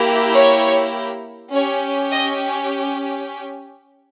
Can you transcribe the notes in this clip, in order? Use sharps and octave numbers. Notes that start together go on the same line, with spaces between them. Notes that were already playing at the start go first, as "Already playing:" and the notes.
Already playing: A#3 E4 G4
C#5
C#4 G4 C#5
D#5